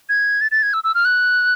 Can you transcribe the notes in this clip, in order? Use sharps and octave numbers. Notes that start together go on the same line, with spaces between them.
G#6
A6
A6
G#6
E6
E6
F6
F#6